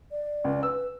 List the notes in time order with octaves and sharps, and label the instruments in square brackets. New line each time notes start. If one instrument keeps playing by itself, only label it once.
[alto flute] D5
[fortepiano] C#2
[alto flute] B4 [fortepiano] E6